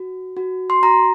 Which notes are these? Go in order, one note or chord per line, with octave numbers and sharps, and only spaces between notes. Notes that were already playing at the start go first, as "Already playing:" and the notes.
Already playing: F#4
F#4
C6
F#4 A#5